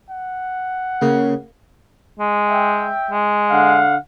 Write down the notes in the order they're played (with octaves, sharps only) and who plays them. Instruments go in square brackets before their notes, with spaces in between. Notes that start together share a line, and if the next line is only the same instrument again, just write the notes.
[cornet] F#5
[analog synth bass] C#3 [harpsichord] A#3
[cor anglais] G#3
[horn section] E5 G5
[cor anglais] G#3
[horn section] D3 F5 F#5